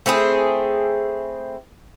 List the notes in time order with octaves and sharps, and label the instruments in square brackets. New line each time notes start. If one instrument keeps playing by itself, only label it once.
[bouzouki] A3 C4 E4 G#4